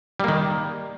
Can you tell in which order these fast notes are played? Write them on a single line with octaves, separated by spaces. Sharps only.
G3 A#3 D#3